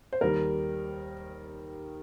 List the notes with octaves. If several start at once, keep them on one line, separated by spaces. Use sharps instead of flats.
C5
D#2 D#3 G3 A#4